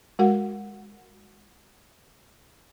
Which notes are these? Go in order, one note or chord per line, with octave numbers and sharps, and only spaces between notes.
G#3 F#4 A#4 F#5